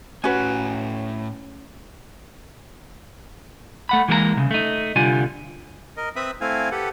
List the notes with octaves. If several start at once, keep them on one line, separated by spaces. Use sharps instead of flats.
A2 C#4 F#4 B4 G#5
A3 F#5 B5
E3 G#3 A#3 G#4 A#5
C2 A#2 C#3
A3 D#4
C2 D3 G3 F4 G#5
A#4 D#5
C4 B4 E5 B5 D#6
A3 C4 E4 F5 G#5
G4 A4 B4 F#5